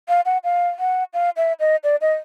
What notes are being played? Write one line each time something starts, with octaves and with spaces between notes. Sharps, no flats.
F5
F#5
F5
F#5
F5
E5
D#5
D5
D#5